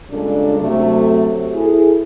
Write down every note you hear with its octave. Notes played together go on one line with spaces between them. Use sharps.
A#2 C#3 G3 G#3 D4 A4
C3 F#3 A3
E4 G#4 A4